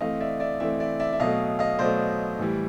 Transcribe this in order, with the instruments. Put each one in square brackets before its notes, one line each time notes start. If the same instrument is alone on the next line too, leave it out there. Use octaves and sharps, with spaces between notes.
[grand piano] E3 A3 C4 D#5 F5
D5 E5
D5 E5
E3 A3 C4 D5 E5
D5 E5
D5 E5
E5
B2 F#3 A3 D#5 F5
D#5 F5
B2 F#3 A3 C5 D5
A2 E3 G3